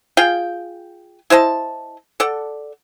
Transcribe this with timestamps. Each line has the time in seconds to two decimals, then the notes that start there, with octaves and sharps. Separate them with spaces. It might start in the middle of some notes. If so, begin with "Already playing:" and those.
0.17 F4 G#4 F5 G5
1.30 E4 C5 D#5 A5
2.20 A4 D5 F#5